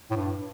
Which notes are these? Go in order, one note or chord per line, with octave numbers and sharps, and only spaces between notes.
A2
G2